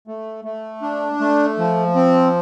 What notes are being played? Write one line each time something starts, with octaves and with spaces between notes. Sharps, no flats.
A3
A3
D4
A3
F3
C4